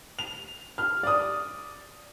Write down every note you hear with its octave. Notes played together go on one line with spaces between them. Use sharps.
F7
F6
D5 D#6